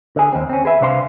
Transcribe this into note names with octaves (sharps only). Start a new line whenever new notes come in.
D3 G#4
D#2 C4
C4 C#4
G#4 B4 E5
C2 C3 D4 C5 F5 C6